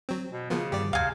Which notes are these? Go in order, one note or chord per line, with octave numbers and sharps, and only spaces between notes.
F#3 C4
B2
C#3 F3 A#3 B3
G2 D#3 G3 G4 D5
D#2 C3 F5 G#5